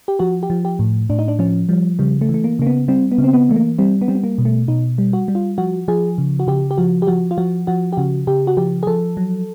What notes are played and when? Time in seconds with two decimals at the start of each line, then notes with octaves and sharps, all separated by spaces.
0.08 G4
0.19 F3 F#4
0.43 G4
0.50 F3
0.65 G4
0.79 A2
1.10 A2 D4
1.19 D#4
1.28 D4
1.39 F3 C#4
1.69 F3 G3
1.99 C#3 G3
2.21 A3
2.29 E3
2.34 A3
2.44 A#3
2.59 C#3 A#3
2.67 B3
2.88 G3 C4
3.11 B3
3.18 C#3
3.24 C4
3.33 B3
3.49 E3 A3
3.56 A#3
3.79 G3 C4
4.02 B3
4.08 G3 C4
4.15 B3
4.23 A#3
4.38 B2
4.45 A3
4.68 B2 D#4
4.98 G3
5.13 F#4
5.28 G3
5.35 F4
5.58 F3 F#4
5.88 F3 G#4
6.18 C#3
6.39 F#4
6.47 C#3 G4
6.71 G4
6.77 F3 F#4
7.02 G4
7.07 F3 F#4
7.31 F4
7.38 F3 F#4
7.67 F3 F#4
7.93 G4
7.97 C#3 F#4
8.27 C#3 G4
8.47 F#4
8.57 F3 G4
8.83 G#4
8.87 F3 A4
9.17 F#3